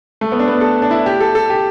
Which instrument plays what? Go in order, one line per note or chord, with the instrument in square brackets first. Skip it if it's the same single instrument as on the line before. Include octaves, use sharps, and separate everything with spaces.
[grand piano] A3
B3
D4
B3
A4
D4
E4
G4
A4
A4
G4